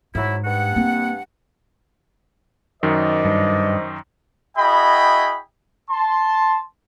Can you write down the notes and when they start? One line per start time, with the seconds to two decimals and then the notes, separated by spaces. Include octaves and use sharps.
0.15 G#2 F#3 E4
0.44 G2 F#5
0.76 A#3 C4
2.83 F#2 D#3 C5 D5 D#5
3.25 G2
4.57 E4 F#4 G#4 D#5 G5 B5
5.90 A5 C6